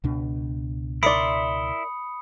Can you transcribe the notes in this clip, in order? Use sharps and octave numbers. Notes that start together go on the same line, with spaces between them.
C#2 B2 D4
E4 A#4 D5 E5 B5 C6 D#6 C#7